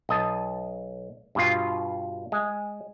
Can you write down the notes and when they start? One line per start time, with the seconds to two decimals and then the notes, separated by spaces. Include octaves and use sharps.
0.09 B1 D#5 A5
1.35 G2 B2 F4
2.32 G#3